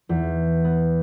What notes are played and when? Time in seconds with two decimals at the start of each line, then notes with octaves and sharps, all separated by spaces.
0.09 E2
0.64 B3